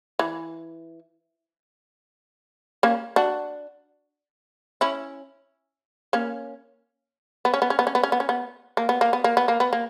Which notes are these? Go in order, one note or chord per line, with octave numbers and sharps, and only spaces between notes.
E3
A#3 C#4
D4 F#4
C#4 E4
A#3 C#4
B3
C#4
B3
C#4
B3
C#4
B3
C#4
B3
C#4
B3
A#3
B3
A#3
B3
A#3
B3
A#3
B3
A#3